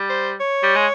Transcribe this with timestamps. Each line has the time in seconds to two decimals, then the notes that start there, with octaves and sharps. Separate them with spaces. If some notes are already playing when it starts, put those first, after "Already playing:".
Already playing: G3
0.09 C5
0.40 C#5
0.63 G3
0.76 G#3